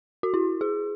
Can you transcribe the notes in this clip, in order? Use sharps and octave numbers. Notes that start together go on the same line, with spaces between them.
F#4
E4
G#4